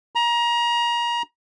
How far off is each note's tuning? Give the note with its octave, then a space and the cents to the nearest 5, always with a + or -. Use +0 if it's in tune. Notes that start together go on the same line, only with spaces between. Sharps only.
A#5 +30